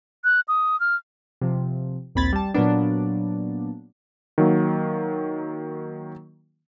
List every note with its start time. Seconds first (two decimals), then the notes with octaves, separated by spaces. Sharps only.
0.24 F#6
0.48 D#6
0.80 F6
1.41 C3 F3
2.15 A#1 D#2 C4 B5 G#6 A6
2.33 G3 A5
2.54 A#2 F#3 A#3 B3 D4
4.38 D#3 F#3 A#3